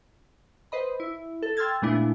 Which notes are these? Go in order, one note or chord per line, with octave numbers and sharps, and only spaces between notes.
B4 C5 D#5 B5
E4
A4
G5 C6 E6 F6 G#6 A6
A#2 G#3 A3 B3 D4 E4